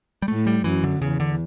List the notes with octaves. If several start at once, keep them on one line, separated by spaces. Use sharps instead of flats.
G3
A2 A3
G3
F#2 E3
D3
E2 C#3
D3